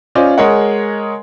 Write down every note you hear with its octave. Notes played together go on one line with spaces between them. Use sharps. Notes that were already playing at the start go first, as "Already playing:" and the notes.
C#4 F4 C5 D5 D#5 G#5
G#3 G#4 A#4 C#5 D#5 F#5